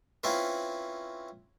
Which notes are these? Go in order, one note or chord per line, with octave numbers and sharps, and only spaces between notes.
C4 C#4 E4 F4 B4